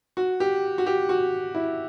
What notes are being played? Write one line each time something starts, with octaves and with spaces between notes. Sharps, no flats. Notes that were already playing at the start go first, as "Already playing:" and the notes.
F#4
G4
F#4
G4
F#4
E4